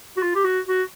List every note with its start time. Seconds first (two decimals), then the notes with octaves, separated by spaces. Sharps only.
0.17 F#4
0.22 F4
0.35 G4
0.44 F#4
0.67 F#4